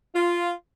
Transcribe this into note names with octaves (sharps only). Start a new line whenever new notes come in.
F4